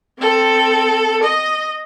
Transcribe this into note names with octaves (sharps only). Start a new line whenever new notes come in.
C4 A4
D#5